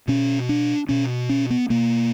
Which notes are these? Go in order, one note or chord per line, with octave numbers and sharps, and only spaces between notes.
B2 C#4
D4
B2 C#4
C#4
B3
B2 A#3